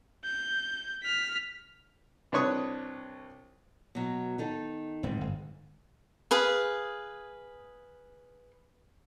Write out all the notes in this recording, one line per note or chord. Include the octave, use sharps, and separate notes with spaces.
G6
F6 B6
C2 D4 B4 C#5 C#6 D#6
B2 F#3
D#3 D#4 A4
D1 G#2 C4
G1
G#4 B4 F5